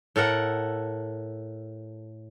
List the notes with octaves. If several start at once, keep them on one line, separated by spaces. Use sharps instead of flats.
A2 A4 A#4 F#5